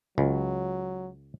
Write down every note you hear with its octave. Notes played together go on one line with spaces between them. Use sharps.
C#2 F#3